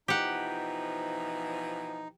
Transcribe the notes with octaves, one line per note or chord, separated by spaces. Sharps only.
B2 E3 F3 D#4 G4 F#5